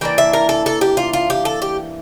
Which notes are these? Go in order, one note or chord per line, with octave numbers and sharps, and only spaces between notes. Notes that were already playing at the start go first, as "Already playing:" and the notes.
E3 A#3 D4 G5
E5
A#4
A4
A4
G4
F4
F4
G4
A4
G4